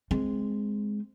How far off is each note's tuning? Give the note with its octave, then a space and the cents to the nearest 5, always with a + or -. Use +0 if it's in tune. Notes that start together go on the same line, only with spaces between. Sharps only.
G#3 +0 C4 +0